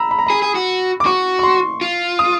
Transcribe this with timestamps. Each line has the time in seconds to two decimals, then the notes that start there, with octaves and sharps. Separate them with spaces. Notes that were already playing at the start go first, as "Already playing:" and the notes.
Already playing: A#5 B5 E6
0.11 B5
0.19 A#5
0.27 G#4 B5
0.42 G#4
0.55 F#4
1.00 D6
1.06 F#4 C#6
1.39 C#6
1.43 C6
1.81 F4
2.19 D#6